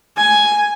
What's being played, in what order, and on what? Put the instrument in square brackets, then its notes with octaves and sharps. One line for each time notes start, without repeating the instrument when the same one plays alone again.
[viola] G#5